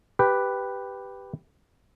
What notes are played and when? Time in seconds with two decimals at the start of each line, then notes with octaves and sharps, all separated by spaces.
0.19 G4 B4 G5